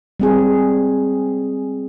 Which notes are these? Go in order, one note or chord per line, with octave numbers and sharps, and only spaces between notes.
G3 C4 G#4